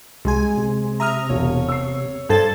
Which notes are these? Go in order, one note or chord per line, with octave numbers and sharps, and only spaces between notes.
C2 G#3 G#5 C6
C3
E5 A#5 D#6 F6
E1 C#5
E6 C7
G2 A4 C5 G#6 A6